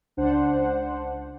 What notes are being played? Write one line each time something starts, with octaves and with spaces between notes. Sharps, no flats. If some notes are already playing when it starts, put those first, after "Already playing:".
C#2 D4 C5 F#5